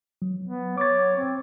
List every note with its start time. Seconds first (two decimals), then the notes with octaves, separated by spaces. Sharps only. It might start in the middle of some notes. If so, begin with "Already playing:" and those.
0.22 F#3
0.43 B3
0.78 C#5 D6 A6
1.16 C4